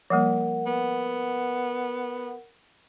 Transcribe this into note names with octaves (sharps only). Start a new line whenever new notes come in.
F3 G3 A#3 A#4 F#5
B3